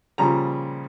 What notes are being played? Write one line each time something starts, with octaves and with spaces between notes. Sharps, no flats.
A#2 C#3 F3 G3 A#5